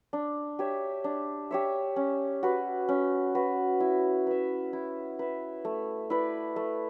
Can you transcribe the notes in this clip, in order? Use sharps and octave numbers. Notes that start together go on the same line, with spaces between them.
D4
G4 C#5 E5
D4
G4 C#5 E5
C#4
F#4 B4
C#4
F#4 B4
E4
B4 E5
E4
B4 E5
A3
E4 B4 D5
A3